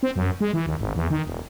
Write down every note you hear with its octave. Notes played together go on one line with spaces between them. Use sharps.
C4
F#2
G#3
E3
D#2
G#1
E2
D#3
E1